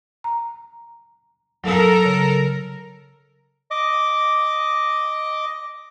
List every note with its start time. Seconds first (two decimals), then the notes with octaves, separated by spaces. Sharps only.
0.24 A#5
1.64 F#3 A4 A#4
2.05 C#3
3.71 D#5 D6